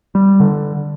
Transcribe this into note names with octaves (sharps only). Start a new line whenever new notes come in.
G3
D3